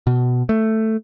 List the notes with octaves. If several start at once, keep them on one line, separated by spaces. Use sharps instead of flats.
B2
A3